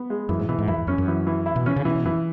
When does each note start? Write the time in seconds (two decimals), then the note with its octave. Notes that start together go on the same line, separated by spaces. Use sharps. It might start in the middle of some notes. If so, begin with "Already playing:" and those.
Already playing: B3
0.10 G#3
0.29 F#2 E3
0.39 G#2
0.49 B2 E3
0.59 G#2
0.68 F#2 E4
0.78 E2
0.87 F#2 C#4
0.98 F#2
1.08 E3
1.27 E3
1.46 E4
1.56 B2
1.66 E3 C#4
1.76 C#3
1.85 B2 E3
1.95 B2
2.05 F#2 E3